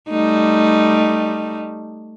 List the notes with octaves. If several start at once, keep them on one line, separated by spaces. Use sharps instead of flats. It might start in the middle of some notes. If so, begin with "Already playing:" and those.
G3 A3 D#4